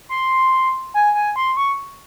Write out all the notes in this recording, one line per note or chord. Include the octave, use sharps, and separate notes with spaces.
C6
G#5
G#5
C6
C#6